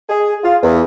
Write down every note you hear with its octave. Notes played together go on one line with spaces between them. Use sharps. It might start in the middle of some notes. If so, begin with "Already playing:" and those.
G#4
F4
E2